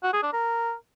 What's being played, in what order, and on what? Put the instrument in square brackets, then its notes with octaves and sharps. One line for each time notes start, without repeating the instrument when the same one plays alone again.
[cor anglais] F#4
G#4
D4
A#4